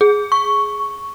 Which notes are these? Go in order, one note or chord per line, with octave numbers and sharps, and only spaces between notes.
G#4
C#6